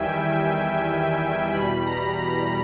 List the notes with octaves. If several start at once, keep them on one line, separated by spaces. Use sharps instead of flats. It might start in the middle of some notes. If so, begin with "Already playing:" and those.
Already playing: E2 D#3 G3 E5 G5 G#5
E2 B2 G3 B5
A#5
A#5